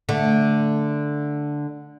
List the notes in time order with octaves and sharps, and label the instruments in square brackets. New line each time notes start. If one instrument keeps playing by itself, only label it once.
[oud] D3 A3